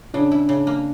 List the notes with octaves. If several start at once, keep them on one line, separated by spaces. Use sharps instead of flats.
C#3 D4
E4
C#3
A#3